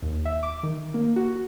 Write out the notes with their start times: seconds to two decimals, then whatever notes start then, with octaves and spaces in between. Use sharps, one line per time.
0.02 D#2
0.25 E5
0.43 D6
0.63 D#3
0.94 A#3
1.16 F#4